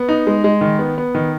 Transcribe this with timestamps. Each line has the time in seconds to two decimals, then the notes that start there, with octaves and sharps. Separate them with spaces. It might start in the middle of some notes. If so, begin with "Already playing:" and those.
Already playing: B3
0.09 D#4
0.27 G#3
0.44 G#3
0.61 D#3
0.79 B3
0.98 B3
1.15 D#3